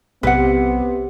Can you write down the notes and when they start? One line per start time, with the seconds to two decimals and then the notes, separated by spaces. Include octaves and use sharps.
0.23 B1 C3 B3 B4 F#5